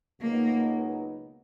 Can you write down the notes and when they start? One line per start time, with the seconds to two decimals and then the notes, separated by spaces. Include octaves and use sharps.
0.21 C#2 B2 F#3 A#3 B3 D#4